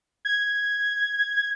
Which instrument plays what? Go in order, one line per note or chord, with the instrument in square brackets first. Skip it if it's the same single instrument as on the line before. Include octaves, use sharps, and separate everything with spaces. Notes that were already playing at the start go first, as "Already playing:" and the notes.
[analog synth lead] G#6